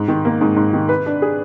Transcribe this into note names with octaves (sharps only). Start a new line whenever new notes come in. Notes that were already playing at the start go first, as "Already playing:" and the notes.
Already playing: G#2
D#3
A#3
G#2
G#2
D#3
B4
D4
G#4